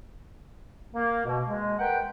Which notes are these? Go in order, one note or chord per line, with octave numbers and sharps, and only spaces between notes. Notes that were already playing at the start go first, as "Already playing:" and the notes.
A#3
B2
G#3
A#4 B4 F#5 G5